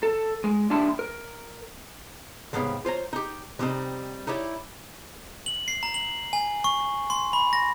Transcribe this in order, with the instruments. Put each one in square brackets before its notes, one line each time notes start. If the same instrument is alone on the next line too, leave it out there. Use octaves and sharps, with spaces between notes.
[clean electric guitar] A4
G#3
D#2 G3 D4 E4 A5 C6
A#4
[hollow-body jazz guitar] C2 G#2 D#3 B3 C#5 F5
F4 C5 C#5 A#5
D#4 G4
C3 G3 C4 D#4
D#4 E4 G4 C#5 D5
[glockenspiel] F#7
C7
A#5
F#7
G#5
C#6
C6
B5
A#6